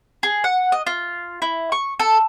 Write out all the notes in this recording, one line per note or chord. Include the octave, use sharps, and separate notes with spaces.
G#4
F#5
D#5
F4
E4
C#6
A4